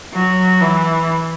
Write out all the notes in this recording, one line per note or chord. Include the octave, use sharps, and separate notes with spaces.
F#3
E3